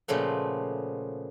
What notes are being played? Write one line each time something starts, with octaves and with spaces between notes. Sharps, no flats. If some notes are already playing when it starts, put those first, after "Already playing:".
A#2 C#3 F3 A3 B3